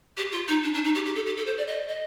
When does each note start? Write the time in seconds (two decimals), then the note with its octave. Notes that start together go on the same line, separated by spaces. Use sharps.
0.17 G4
0.32 F4
0.48 D#4
0.63 D4
0.74 D4
0.84 D#4
0.95 G4
1.05 G4
1.15 A4
1.26 G4
1.37 A4
1.47 C5
1.58 D5
1.67 D#5
1.88 D#5